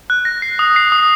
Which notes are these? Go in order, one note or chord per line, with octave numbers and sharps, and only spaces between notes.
F#6
A#6
C7
D#6
C7
D#6